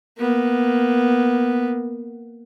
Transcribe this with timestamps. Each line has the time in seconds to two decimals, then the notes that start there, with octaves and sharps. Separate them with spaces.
0.19 A#3 B3